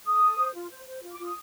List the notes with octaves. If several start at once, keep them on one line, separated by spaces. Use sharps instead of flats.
A4 D#6
A4
C5
F4
C5
C5
F4
D6
F4 D#6